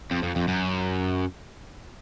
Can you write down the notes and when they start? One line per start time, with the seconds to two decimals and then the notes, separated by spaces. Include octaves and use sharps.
0.11 F2
0.23 F2
0.36 F2
0.48 F#2